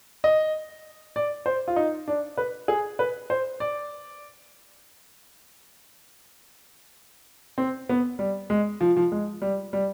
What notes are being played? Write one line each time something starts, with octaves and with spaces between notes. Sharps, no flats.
D#5
D5
C5
F4
D#4
D4
B4
G#4
B4
C5
D5
C4
B3
G3
G#3
F3
F3
G#3
G3
G3